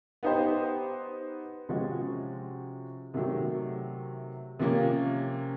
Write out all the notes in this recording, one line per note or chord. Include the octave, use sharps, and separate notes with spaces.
B3 D#4 G4 C5
C3 F3 G#3 C#4 F#4
C3 D#3 F#3 A3
C3 F3 A#3 C#4